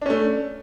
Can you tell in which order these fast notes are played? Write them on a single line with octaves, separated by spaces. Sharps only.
D4 C#4 A3